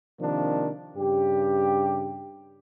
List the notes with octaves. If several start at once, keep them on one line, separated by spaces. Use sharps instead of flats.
C3 D#3 F3 A#3 D4
G2 C#3 G4